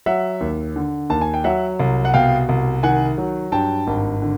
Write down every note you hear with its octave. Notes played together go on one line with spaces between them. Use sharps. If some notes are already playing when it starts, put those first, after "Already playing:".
F#3 E5 F#5
D#2
D3
D#2 A5
G#5
G5
F#3 E5 F#5
C2
F#5
B2 F5 G5
C2
D#3 F#5 G#5
F#3
G2 G5 A5
G#1
D3